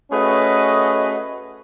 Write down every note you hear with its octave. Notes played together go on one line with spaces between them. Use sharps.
A3 C#4 F#4 G#4 B4 D#5